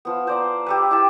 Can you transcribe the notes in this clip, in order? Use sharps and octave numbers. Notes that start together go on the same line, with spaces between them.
F3 B3
C5 D5 A#5
G4 A4 B4
E4 G4 A5